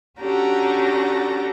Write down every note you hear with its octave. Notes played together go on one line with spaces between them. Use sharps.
C#4 D4 F#4 G4 A4 A#5